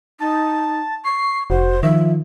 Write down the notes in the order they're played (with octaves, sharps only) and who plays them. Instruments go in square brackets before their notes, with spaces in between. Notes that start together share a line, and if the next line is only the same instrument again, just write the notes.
[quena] D#4 [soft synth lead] A5
[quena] C#6 [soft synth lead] C7
[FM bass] F1 [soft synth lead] F#4 [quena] C5
[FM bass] D#3 [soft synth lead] F3 [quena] E5